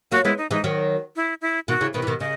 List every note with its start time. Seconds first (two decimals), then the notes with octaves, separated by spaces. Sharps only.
0.12 F#3 A#3 F#4
0.25 G#3 B3 E4
0.38 D#4
0.51 E3 G#3 D#4
0.64 D#3 F#3
1.16 E4
1.41 E4
1.68 B2 D#3 F#4
1.81 C#3 E3
1.94 B2 D#3 B4
2.02 E3
2.07 B2 D#3
2.20 C#3 D#5